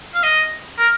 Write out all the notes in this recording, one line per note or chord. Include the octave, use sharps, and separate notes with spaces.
F5
D#5
A#4